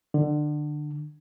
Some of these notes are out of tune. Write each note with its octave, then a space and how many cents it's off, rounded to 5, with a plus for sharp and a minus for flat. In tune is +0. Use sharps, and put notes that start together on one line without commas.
D3 +25